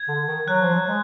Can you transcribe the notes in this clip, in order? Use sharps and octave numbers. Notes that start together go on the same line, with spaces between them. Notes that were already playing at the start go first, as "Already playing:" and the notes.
Already playing: G#6
D3
D#3
F#3 F#6
F3
F#3
G#3